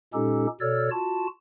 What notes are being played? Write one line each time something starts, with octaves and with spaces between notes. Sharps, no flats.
A#2 G#3 C#4 D#4 G4 A4
B2 A4 C#5 D5 E6 F6
F4 F#4 A5